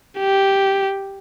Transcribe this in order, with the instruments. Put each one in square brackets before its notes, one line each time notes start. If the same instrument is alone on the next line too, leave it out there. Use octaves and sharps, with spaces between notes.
[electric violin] G4